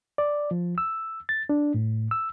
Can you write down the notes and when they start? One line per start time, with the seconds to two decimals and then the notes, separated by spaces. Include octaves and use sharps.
0.18 D5
0.51 F3
0.78 E6
1.29 A6
1.49 D4
1.74 A2
2.11 E6